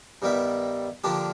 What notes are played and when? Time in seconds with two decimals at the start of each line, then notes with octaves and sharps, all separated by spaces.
0.22 G2 D#3 G3 B3 E4
1.04 D3 F3 A#3 D4 G4